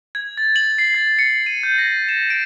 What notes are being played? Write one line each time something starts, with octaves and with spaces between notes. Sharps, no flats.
G#6
A6
F#7
C7
A6
C#7
D#7
G6
A#6
E7
D7